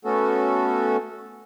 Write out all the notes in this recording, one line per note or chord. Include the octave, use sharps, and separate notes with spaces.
A3 B3 C#4 F#4 A4